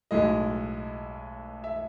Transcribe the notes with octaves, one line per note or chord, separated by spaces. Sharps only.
B1 A2 G#3 D#5
E5